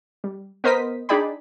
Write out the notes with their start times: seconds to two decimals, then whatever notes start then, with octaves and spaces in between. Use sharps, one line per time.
0.24 G3
0.64 B3 A#4 C5 D#5 D#6 B6
1.09 D4 D#4 G#4 D5 G5 B5